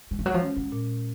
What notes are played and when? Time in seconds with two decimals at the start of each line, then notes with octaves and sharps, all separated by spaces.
0.11 F#3 G#3
0.19 F3
0.26 F#3
0.34 F3
0.42 C#4
0.57 F#3
0.72 A#2